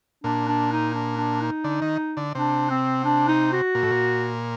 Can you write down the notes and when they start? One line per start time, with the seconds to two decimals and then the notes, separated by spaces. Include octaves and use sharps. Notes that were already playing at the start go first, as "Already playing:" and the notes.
0.24 A#2 D4
0.48 D4
0.72 D#4
0.94 D4
1.17 D4
1.41 D#4
1.64 D3
1.82 D#3
2.17 D3
2.35 C3 D4
2.70 C4
3.04 D4
3.28 D#4
3.52 F#4
3.75 A#2
3.83 A2
3.91 A#2